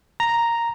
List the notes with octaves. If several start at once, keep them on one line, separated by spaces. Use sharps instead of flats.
A#5